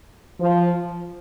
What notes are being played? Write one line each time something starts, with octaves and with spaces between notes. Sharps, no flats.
F3